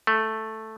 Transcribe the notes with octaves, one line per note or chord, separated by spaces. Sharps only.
A3